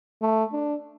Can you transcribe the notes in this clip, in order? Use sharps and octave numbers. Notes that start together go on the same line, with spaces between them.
A3
D4